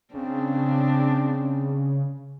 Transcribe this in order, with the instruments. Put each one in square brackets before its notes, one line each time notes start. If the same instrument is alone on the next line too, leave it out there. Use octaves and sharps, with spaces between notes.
[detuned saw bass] C#3 [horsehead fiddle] C4 D4